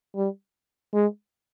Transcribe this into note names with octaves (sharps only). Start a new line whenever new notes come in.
G3
G#3